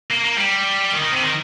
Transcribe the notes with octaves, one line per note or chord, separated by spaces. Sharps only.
A#3
A#3
G3
D#3
D#3
C3
D#3